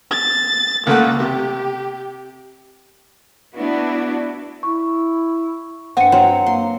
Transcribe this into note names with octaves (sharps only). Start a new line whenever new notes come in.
A6
C#2 A3 A#3 F#5
C3 G4
B3 D4 E4 F#4
E4 C#6
G2 C4 F#5 G#5 C#7
F#3 C4
A#3 C6